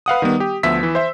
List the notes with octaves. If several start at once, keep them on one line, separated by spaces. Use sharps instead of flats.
B4 F5 F#5 D#6
D#3 G3 B3
G4
D2 F3 B3 E5 E6 B6
E3
C5 E5